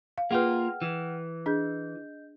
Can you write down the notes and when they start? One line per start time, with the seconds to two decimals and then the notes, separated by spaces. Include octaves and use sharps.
0.18 F5
0.31 A#3 F4 G#4 B4 F#5 G5 F6
0.82 E3
1.46 D4 G#4 D#5 G6